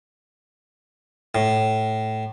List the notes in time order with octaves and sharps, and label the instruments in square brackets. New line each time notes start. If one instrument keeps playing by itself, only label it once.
[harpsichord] A2